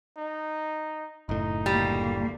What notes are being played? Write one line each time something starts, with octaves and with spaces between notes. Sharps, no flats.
D#4
F#1 A2 D#4
D2 G3 A#3